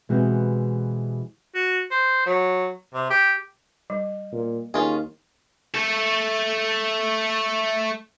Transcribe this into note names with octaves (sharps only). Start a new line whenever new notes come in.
B2 E3 G#3 C4 F#4 G4
F#4
C5
F#3
C3
G4
G3
A#2
D#2 C#4 F4 G#4
A3 A4